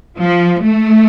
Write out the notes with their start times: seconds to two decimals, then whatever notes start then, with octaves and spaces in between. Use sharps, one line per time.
0.18 F3
0.62 A3